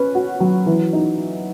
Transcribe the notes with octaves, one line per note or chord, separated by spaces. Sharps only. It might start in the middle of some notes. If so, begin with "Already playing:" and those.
Already playing: C#4 B4
F#4
F#3
E3
D#4